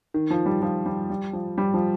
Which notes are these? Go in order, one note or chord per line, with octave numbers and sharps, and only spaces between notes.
D#3
F3
G3
F3
G3
G3
F3
G3
F3